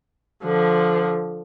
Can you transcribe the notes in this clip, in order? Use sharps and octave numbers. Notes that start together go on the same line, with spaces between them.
D3 F3